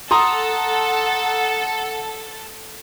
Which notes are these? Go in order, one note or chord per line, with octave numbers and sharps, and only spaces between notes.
A4 F#5 A#5 C6 D#6